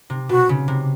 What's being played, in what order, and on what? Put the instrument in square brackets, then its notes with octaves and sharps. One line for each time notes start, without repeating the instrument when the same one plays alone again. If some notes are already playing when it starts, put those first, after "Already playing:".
[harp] C3
[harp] B2 [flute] F#4
[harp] C#3
C3